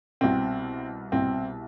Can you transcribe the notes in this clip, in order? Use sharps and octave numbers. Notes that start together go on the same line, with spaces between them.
C2 B2 C4
C2 B2 C4